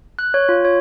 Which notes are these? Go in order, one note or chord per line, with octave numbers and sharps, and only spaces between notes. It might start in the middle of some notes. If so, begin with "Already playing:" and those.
F#6
C#5
F4
C#5